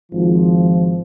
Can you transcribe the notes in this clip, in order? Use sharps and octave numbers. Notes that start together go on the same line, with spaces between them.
G#1 F3